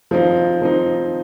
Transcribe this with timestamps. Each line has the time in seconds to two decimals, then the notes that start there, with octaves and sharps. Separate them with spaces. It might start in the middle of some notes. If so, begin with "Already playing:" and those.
0.11 F3 C4 D#4
0.62 F3 C4 D#4